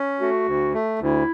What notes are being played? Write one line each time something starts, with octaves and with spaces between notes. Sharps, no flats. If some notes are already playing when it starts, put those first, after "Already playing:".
Already playing: C#4
A3 F#4
D2
A3
D2 E4